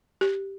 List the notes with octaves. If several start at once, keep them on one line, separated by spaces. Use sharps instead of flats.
G4